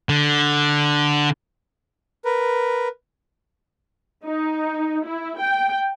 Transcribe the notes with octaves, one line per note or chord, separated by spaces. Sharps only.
D3
A#4 B4
D#4
E4
G5